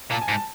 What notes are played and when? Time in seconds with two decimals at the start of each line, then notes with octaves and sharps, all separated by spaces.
0.11 A#2 A5
0.21 G#5
0.28 G#2
0.32 A5